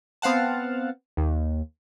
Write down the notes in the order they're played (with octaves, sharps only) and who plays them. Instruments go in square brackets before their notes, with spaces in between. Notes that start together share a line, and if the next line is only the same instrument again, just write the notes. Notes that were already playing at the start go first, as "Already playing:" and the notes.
[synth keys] B3 C4 F5 F#5 A5
D#2